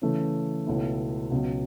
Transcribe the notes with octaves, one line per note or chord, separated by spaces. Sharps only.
C#3 E3 A3
C#2 B2 A3 C#4 E4
C#2 B2 F#3